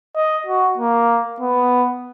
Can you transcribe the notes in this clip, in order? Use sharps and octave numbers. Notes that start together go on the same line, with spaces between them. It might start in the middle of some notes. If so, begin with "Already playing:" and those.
D#5
F#4
A#3
B3